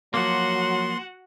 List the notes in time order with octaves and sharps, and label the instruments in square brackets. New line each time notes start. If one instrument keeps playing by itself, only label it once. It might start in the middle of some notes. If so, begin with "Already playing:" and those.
[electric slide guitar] F3 A#3 [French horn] F#3 [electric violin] F#4 F#5 [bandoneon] C6